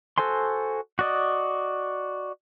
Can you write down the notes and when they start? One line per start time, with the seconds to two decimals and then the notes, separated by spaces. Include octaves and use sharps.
0.18 F#4 A4 C5 G#5 C6
0.99 F#4 D5 D#5